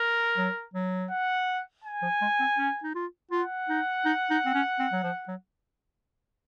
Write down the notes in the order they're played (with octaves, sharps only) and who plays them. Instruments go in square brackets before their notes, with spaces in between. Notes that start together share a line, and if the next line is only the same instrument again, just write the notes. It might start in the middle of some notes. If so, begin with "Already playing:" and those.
Already playing: [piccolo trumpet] A#4
[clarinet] F#3
F#3
[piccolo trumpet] F#5
G#5
[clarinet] F3
G#3
C4
C#4
D#4
F4
[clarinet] F4 [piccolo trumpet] F#5
[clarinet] D#4
D#4
D#4
C4
C#4
C4
F#3
F3
F#3